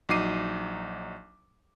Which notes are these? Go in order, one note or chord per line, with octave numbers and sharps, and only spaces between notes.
A#1 F#3 D#4 D6 C7 D#7